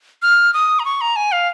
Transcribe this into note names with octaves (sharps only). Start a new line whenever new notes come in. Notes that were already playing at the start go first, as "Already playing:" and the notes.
F6
D#6
A#5
C#6
A#5
G#5
F5